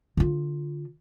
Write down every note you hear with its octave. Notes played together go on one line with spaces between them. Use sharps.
D3 F4